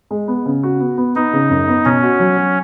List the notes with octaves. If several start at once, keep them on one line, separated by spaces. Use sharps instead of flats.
G#3
B3
C#3
F#4
B3
B3
B3 D#4
C#3
F#2
B3
B2 C#4
F#4
F#3
F#3